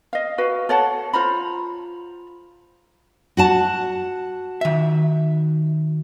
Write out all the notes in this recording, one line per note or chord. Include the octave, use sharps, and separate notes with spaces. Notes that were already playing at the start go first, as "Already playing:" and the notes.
D#5 F5
F#4 B4 F5
A4 C#5 F#5 A5
F4 C5 A#5 B5
F#4 F#5 A5
D#3 E5